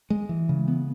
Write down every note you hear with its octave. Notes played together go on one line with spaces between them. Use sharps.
G#3
E3
C#3
B3